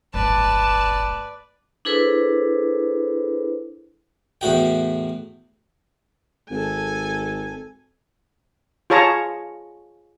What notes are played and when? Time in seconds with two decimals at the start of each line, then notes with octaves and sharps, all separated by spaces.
0.14 D1 G1 B4 D5 A5
1.85 D4 E4 G#4 A4 B4 C5
4.41 E2 A2 F#4 G5
6.51 G#1 A4 G#5
8.90 F4 G#4 C#5 A5 A#5